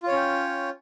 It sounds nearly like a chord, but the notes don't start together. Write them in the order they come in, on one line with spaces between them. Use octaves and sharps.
F4 C#5 C#4 G5